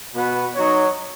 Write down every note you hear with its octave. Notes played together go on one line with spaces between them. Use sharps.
B2 B3 F#4 B4
F#3 D#4 F#4 C#5